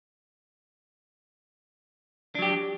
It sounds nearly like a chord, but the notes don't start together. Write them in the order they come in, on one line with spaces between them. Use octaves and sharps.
D4 F#3 G4